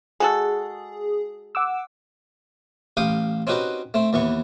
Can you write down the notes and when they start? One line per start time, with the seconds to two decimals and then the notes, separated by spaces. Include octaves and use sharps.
0.20 G#3 F#4 G#4 A4
1.55 F#5 D6 E6
2.97 A1 G4 F5 G5 D#6
3.47 C4 C#4 D#4 F#4 G4 B4
3.94 A3 C4
4.13 D#2 E3 B3 C#6